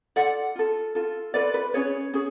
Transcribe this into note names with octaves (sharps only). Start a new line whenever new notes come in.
F4 A4 D5 F#5
F4 A4
F4 A4
F4 A4 B4 D5
B4
C#4 G#4 B4 C#5
C#4 G#4